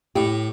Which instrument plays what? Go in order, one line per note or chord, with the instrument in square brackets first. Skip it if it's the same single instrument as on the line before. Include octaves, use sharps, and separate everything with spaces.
[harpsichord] A2 [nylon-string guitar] G4